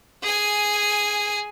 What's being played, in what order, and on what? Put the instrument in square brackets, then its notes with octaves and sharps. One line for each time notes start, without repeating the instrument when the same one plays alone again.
[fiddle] G#4 G#5